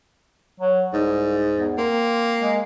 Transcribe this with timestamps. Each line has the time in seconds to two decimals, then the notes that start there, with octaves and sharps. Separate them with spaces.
0.60 F#3
0.93 C2 G#2
1.57 E2
1.78 A#3 C4
2.40 G#3